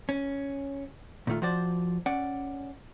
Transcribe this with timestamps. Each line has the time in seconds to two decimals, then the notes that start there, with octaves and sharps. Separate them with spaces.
0.09 C#4
1.27 A#2 D#3 A3 F4
1.42 F3 F#4 C5 D5
2.06 C#4 D5 F#5